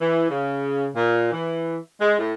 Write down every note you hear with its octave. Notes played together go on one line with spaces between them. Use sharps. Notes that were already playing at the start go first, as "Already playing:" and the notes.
E3
C#3
A#2
E3
G#3
A2